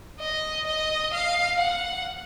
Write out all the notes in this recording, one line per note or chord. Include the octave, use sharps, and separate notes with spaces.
D#5
D#5
F5
F#5